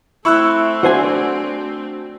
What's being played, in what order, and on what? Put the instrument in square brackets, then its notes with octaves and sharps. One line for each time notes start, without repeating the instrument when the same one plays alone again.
[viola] A3 C4 [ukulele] E4 B5 [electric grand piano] C#6 E6 F#6
[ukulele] D4 D#4 F#5 [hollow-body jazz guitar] F#4 C5 G#5